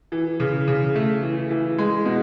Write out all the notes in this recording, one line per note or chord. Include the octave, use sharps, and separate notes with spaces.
E3
C#3
C#3
A3
E3
E3
G#3
B2